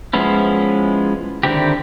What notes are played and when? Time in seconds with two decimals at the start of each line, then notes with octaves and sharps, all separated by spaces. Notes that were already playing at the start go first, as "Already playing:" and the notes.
0.13 F3 G#3 B3 C#4 E4
1.43 D3 D#3 C4 E4 G4